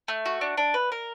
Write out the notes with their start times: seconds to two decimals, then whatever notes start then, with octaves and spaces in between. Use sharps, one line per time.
0.08 A3
0.26 F#4
0.41 D4
0.57 D4
0.74 B4
0.92 A#4